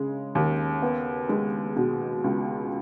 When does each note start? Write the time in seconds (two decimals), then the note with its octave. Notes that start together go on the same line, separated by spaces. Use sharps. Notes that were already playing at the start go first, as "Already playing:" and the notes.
Already playing: C#3 G#3
0.35 D#2
0.82 B3
1.29 G#3
1.76 B2
2.24 C#2